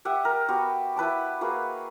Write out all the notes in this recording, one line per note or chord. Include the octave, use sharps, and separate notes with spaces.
G4 E5 F#5 D#6
A#4
B3 F#4 G4
E4 B4 A5 D6
A#3 F#4 G#4 B4